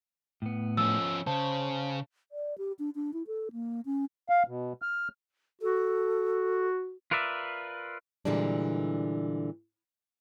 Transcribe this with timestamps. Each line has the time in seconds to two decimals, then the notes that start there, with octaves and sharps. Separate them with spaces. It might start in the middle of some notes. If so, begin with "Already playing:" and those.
0.42 A2 B3
0.77 F3 C#4 E6
1.27 C#3 C5 A5
2.32 D5
2.58 G4
2.79 D4
2.95 D4
3.13 E4
3.27 A4
3.52 A#3
3.85 C#4
4.29 F5
4.47 B2
4.82 F6
5.61 F#4 A4
7.11 F4 A#4 B4 D5 E5
8.25 A#2 D3 E3 G3 G#3 D4